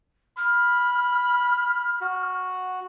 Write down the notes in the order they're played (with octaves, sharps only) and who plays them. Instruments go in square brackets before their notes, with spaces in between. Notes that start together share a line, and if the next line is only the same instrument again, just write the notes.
[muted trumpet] B5 [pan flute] F6
[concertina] F#4